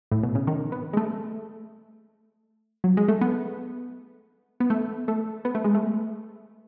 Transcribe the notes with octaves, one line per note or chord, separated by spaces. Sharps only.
A2
B2
C#3
D#3
B3
G#3
A3
F#3
G#3
A3
B3
B3
A3
A3
B3
A3
G#3
A3